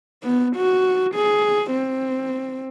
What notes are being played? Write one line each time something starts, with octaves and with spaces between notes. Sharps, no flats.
B3
F#4
G#4
C4